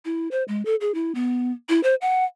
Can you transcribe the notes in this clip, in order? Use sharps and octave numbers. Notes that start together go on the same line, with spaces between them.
E4
C5
G#3
A4
G#4
E4
B3
E4
C5
F#5